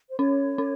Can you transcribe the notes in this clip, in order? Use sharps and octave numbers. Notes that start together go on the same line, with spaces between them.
C5
C#4 C#5
C#4